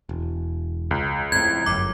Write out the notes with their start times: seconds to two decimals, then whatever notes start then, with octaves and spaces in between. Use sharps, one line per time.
0.09 E1
0.91 C#2
1.32 F2 A2 G#6
1.66 G1 F#2 D6